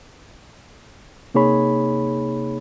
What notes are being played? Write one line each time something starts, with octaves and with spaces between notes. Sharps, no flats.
C3 A#3 D#4 G#4 C#5 B5